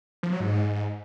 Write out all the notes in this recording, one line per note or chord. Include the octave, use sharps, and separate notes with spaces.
F3
F#3
G#2